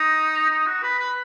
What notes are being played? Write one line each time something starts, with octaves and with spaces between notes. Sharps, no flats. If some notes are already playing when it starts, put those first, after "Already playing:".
Already playing: D#4
D#4
F#4
B4
B4